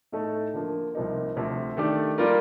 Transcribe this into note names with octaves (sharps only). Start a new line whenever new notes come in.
A2 A3 D#4 A4
D3 F3 A#3
C2 C3 F3 A#3 D#4
D2 C3 F3
D#3 A3 D4 G4 D5
G3 A#3 F4 A#4 D5